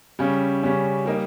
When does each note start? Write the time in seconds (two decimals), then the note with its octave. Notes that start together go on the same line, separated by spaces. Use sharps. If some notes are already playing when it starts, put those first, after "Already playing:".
0.19 C#3 G3 C#4
0.63 C#3 G3 C#4
1.05 G3 A#3 D#4